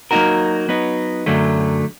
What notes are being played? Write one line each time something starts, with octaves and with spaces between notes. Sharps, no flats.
F#3 A#3 D#4 F#4 A#4
F#3 B3 D#4
F#2 D3 F#3 A3